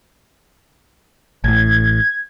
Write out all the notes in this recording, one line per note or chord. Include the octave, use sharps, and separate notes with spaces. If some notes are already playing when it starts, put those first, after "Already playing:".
A1 A2 G#6